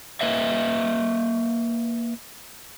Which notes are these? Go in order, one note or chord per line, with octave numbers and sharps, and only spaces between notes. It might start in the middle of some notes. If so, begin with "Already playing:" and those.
A#3 B4 D#5 E5